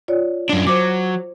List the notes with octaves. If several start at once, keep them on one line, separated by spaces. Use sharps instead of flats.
F4 C#5 D5
F#2 D4
F#3 C5 D6